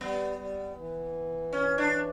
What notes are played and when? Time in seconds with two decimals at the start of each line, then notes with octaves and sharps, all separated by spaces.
0.01 G3 B3
0.38 G3
0.76 E3
1.53 C#4
1.78 D4